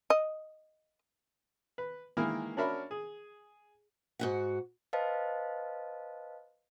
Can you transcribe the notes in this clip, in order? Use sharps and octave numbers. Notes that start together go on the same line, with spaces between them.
D#5
B4
D#3 E3 G#3 A#3 E4 A#4
C#4 D4 F#4 A#4 E5 B5
G#4
G#2 F#4 F#5
B4 C5 D#5 F5 A5